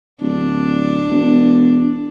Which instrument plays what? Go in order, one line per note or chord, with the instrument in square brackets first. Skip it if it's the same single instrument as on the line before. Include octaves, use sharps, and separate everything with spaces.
[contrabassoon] D1 [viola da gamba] D4
[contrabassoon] E1